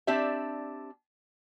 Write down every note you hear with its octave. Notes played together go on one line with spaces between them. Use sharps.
C4 D4 G4 D5 E5